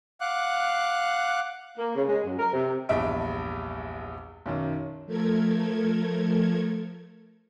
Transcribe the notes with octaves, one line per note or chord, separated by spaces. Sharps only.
F5 F#5 D6 F#6
A#3
C#3
G#3
F#2
A#4
C3
A#1 E2 G2 E5 D7
B1 F#2 D#3
F3 A3 A4 A#4 G#6